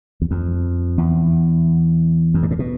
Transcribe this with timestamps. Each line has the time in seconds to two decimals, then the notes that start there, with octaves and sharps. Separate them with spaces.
0.22 E2
0.31 F2
0.98 E2
2.34 F2
2.43 G2
2.51 A2
2.59 B2